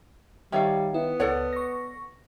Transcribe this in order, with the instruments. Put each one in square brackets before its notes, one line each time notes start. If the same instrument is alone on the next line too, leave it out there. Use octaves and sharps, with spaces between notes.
[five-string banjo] D#3 F5 [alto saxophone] G3 [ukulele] C#5 E5
[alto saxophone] B3 [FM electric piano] E4
[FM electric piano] C#2 [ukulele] A4 D5 F#5 [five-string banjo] C#5
[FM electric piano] C#6 A#6